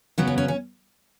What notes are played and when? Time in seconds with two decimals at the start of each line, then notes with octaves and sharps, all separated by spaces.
0.18 C#3 F#3 B3 F#4
0.28 C#4
0.38 C#4
0.48 C#4